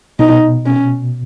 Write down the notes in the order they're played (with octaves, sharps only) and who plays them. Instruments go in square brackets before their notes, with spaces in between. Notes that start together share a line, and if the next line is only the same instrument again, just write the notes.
[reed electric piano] B2 [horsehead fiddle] D#4
[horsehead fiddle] C#4